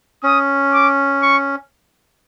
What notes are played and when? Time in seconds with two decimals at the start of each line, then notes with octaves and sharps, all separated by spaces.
0.23 C#4 D#6
0.73 D6
1.22 C#6